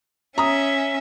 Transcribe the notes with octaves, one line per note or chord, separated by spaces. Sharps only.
C#4 E5 A#5 D#6